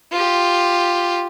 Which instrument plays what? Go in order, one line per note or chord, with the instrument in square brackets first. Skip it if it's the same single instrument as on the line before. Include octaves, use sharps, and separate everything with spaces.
[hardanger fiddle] F4 G4